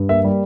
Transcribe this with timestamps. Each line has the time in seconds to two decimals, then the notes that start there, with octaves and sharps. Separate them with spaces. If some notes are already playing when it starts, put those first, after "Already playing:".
Already playing: G2
0.09 A#3 E5
0.24 G3